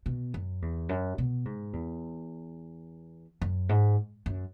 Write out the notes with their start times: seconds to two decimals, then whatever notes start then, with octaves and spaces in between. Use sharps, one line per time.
0.06 B2
0.34 F#2
0.62 E2
0.89 F#2
1.18 B2
1.45 G#2
1.73 E2
3.42 F#2
3.69 G#2
4.26 F#2